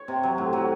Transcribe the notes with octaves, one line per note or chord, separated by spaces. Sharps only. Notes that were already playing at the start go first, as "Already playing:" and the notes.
Already playing: C#5
C3
F#3
A2
F#3